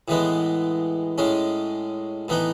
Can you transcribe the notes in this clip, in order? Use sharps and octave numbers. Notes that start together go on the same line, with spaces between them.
A2 E3 G#3 B3
A2 G#3 C#4
A2 E3 B3 D#4